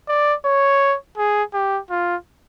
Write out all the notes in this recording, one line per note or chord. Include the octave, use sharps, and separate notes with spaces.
D5
C#5
G#4
G4
F4